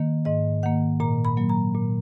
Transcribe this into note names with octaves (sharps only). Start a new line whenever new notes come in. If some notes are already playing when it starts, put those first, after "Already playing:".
Already playing: D#3 A#3
G#2 D#5
D#3 A#3 F#5
A#2 A#5
B5
F#3 A#3
A#5
A#2